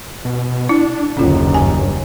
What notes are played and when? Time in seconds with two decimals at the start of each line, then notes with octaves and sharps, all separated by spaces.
0.25 B2
0.69 D4 E4
1.17 F#1 D#2 D3 C#4 F4
1.54 G2 G#5